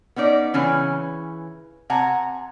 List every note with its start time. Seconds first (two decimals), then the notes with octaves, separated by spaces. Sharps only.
0.16 B3 C#4 D#4 D5
0.54 C#3 E3 C#4 B4
1.90 C3 F#5 G#5 A#5